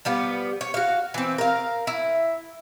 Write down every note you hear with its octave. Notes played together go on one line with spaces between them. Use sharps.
F3 G3 B3
C#5
F#4 F5
E3 C4
A#4 F5
E4